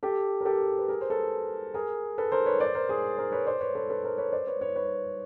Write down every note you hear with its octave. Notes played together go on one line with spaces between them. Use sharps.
G4 A4
A#4
G4 A4
B4
G#4 A#4
C5
A4 B4
G#4 A#4
A4 B4
A#4 C5
B4 C#5
C5 D5
A#4 C5
G#4 A#4
A#4 C5
B4 C#5
C5 D5
B4 C#5
A4 B4
A4 B4
A#4 C5
B4 C#5
C5 D5
B4 C#5
B4 C#5
B4 C#5